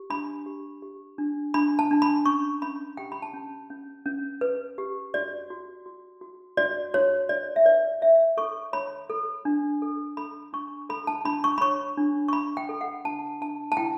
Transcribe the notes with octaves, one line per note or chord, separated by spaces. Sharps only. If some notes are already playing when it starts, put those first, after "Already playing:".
Already playing: G4
D4 B5
G4
G4
D4
D4 B5
A5
D4
B5
C#4 C#6
C#4 B5
G4 G5
B5
A5
C#4
C#4
C#4
B4
G4
F#4 D5
F#4
F#4
F#4
F#4 D5
F#4 C#5
F#4 D5
E5
B4 D5
C#5 E5
A4 C#6
C#5 B5
A4
D4
A4
A4 B5
D4 C#6
A4 B5
A5
D4 B5
C#6
B5
C#5 C#6
D4
C#6
D4 B5
G5
A4
F#5
D4 A5
D4 A5
A5
E4 G5